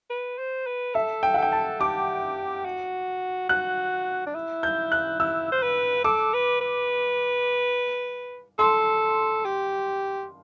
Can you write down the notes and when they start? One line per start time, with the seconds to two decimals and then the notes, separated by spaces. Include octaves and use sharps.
0.10 B4
0.39 C5
0.67 B4
0.95 A4 E5
1.23 G5
1.34 F#5
1.38 A4 G5
1.52 A5
1.80 G4 D6
2.65 F#4
3.49 F#4 F#6
4.27 D4
4.35 E4
4.63 G6
4.92 F#6
5.20 E4 E6
5.52 C5
5.63 B4
6.04 A4 D6
6.34 B4
6.61 B4
8.59 A4 C6
9.45 G4